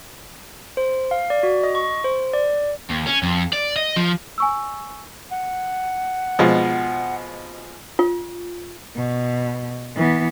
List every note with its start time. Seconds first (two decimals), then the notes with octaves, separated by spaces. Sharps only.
0.77 C5
1.11 F5
1.30 D5
1.43 F#4
1.64 D#5
1.75 C#6
2.04 C5
2.33 D5
2.90 D#2
3.07 C#4
3.23 F2
3.53 D5
3.76 D#5
3.96 F3
4.38 G#5 C#6 E6
5.31 F#5
6.39 B2 F3 G#3
7.99 F4
8.96 B2
9.96 E3 B3